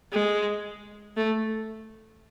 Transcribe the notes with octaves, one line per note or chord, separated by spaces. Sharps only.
G#3
A3